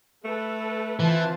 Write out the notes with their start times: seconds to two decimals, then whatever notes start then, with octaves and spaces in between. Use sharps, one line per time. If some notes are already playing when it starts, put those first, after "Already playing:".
0.25 A3 A4 B4
1.00 E3 C4 F4 A5